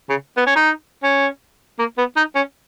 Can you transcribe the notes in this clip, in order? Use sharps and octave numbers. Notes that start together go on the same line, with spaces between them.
C#3
B3
C#4
D#4
C#4
A#3
B3
D#4
C#4